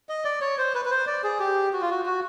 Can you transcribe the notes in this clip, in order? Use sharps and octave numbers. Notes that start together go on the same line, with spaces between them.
D#5
D5
C#5
C5
B4
B4
C5
D5
G#4
G4
F#4
F4
F#4
F#4